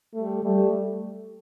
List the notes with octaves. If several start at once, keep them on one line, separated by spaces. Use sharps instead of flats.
G3 A3
G3 A3